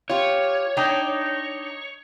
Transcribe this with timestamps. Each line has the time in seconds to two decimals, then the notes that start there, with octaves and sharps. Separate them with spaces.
0.10 F4 G4 C#5
0.77 D4 D#4 G5